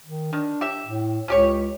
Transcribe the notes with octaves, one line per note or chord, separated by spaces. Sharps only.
D#3
D#3 D4
G4 E5
A2
C#2 C#4 G4 C#5